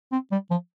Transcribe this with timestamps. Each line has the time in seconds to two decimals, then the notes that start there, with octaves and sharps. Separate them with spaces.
0.12 C4
0.32 G3
0.51 F3